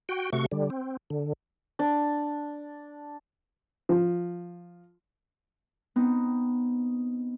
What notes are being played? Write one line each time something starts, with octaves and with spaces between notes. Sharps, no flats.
F#4 G5
C3 A3 F#4 C#6
D3 G3
C4
D3
D4
F3
B3 C4 D#4